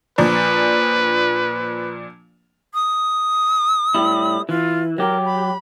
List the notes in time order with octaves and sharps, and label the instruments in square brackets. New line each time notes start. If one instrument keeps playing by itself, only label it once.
[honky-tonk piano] A#2 F3 D4 [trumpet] B4
[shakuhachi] D#6
[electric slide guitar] A2 G3 E4
[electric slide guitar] E3 [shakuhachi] F4
[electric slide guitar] F#3 G4 [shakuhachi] A#4
[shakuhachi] B5